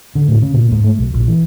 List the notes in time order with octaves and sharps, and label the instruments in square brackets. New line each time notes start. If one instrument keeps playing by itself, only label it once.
[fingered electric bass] D3
A2
C#3
A#2
G#2
A3
B1
A#1
E3